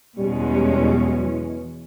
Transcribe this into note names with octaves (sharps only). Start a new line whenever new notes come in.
E2 B2 G3 G#3 C#4
G3
F#3
E3